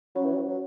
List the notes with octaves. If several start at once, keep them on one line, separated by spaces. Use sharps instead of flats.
F#3 C#4
E3
F#3
F#3